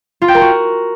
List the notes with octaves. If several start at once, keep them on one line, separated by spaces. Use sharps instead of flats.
F4
G5
A#4
F#4